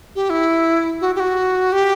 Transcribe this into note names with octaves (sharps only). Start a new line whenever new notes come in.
G4
E4
F#4
G4
F#4
G4